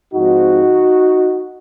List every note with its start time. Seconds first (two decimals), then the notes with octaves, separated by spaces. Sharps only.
0.12 G#2 F3 C4 D#4 F#4